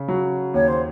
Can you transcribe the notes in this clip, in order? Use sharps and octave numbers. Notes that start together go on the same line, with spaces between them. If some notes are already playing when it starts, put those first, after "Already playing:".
Already playing: C#3
F#3
D#2 C#5
C5